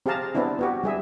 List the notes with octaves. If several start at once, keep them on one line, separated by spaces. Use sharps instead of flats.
C4 G4 G#4 F5 A5 A#5
B3 C4 D4 E4
B3 F#4 G4
G3 G#4 E5